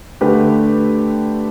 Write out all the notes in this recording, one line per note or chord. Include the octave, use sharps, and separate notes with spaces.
D3 A3 G4 B4